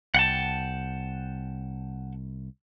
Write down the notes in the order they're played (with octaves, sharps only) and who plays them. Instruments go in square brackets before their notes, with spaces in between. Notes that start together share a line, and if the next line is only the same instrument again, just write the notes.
[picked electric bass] C2 [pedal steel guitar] F#5 G5 A5